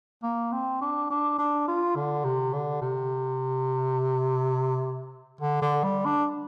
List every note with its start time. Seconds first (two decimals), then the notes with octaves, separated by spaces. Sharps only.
0.23 A#3
0.52 C4
0.81 D4
1.10 D4
1.38 D4
1.68 F4
1.96 D3
2.24 C3
2.53 D3
2.82 C3
5.41 D3
5.62 D3
5.84 G3
6.05 D4